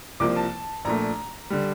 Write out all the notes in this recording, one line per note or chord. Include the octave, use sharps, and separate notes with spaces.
C2 C3 F3 A#3 D6
A5
A#1 A#2 A3 A#5
D3 G3